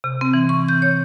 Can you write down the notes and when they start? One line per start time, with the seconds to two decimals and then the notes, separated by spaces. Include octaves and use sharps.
0.04 C3
0.21 C4
0.34 E3
0.49 C#6
0.69 G6
0.82 C#5